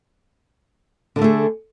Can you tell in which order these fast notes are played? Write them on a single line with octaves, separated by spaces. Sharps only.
D3 A#3 A3 G#4